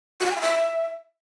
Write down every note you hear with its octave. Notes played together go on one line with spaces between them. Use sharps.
F#4
F#5
G#5
F5
E5